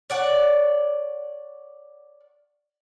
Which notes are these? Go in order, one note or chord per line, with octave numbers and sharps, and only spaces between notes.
C#5 D5 F#5